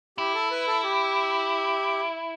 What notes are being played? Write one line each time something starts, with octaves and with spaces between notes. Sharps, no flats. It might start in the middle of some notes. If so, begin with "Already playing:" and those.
E4 G4
A4
B4
A4
G4